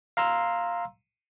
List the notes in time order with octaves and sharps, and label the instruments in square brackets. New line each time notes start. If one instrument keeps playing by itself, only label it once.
[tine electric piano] F5 A#5 C6 E6